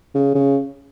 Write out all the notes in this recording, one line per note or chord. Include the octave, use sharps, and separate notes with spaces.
C#3
C#3